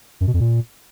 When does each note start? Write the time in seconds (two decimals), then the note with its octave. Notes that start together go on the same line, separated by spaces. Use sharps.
0.21 F#2
0.27 B2
0.34 F2
0.40 A#2